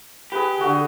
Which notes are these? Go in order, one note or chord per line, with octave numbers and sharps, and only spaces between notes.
G4 G#4 B4
D3 F#4